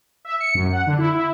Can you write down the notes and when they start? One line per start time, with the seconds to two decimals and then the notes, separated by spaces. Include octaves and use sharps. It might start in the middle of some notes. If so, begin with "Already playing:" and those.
0.25 E5
0.40 C#7
0.55 F#2
0.72 F#5
0.87 D3
0.98 E4
1.15 E4